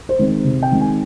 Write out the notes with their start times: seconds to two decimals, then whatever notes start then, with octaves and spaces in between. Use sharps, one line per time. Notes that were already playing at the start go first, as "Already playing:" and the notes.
0.09 C5
0.19 D#3 G#3 C4 D#4
0.44 C3
0.63 G5
0.71 D#3 G#3 C4 D#4
0.81 G#5